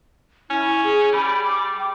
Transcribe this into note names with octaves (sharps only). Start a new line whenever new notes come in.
C#4 E4
G#4
G3 B5
D6
G5